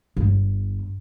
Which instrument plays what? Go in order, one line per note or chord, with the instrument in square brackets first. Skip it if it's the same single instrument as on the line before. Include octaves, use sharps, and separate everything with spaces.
[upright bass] G1